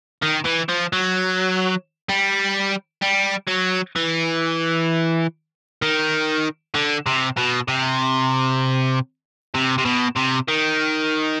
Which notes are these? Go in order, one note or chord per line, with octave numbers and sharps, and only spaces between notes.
D#3
E3
F3
F#3
G3
G3
F#3
E3
D#3
D3
C3
B2
C3
C3
C3
B2
C3
D#3